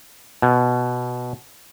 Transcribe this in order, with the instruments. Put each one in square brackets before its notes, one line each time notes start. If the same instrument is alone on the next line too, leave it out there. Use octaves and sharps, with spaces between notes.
[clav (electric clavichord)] B2